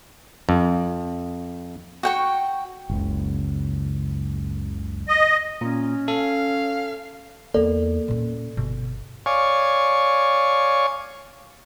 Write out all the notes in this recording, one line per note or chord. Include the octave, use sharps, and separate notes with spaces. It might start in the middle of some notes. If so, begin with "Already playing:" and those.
F2
F#4 G5 C#6
F#1 C#2
D#5
A#2 C#4
A4 F5
E2 A#3 D#4 A4 D5
A#2 C#4
G1 B2
C#5 D5 F5 G#5 C#6